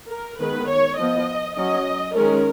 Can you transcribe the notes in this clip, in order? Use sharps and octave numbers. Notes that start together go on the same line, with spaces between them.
A#4
D#3 G#3 B3 B4
C#5
F3 B3 D#5
F#3 C#4 D#5
D#3 G#3 C#4 A#4